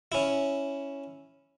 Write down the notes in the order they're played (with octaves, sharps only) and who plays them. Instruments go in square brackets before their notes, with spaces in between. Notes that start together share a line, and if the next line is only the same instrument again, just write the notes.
[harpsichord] C#4 E4